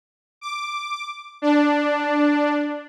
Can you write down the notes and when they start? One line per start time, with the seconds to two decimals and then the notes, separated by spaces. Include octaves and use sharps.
0.41 D6
1.42 D4